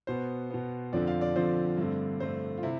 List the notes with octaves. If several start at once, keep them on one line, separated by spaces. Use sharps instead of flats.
B2 B3 C5
B2 B3
F2 D3 F3 C4 D5
F5
D5
F2 D3 F3 C4 C5
G2 D3 A3 C4
G2 D3 A3 C4 C5
F4
C3 E4